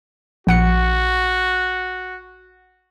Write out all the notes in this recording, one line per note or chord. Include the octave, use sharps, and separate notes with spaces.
A#1 F#4 F#5 C#7